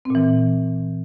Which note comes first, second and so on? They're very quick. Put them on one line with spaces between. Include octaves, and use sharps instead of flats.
C4 A#2 E3